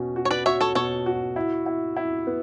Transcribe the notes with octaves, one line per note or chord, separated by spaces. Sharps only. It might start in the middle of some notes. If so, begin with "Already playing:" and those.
Already playing: B2 C#4 F#4
F#4
C#5
B4 D5
F#4 C#5 E5
A4 C#5
B2 A4 C#5
F#4
E4
E4
E4
B3